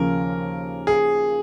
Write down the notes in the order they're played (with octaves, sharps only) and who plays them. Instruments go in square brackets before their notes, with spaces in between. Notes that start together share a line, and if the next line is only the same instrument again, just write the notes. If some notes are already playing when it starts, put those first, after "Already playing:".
Already playing: [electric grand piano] D#2 C#3 F3 A#3 C#4 [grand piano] A#4
[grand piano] G#4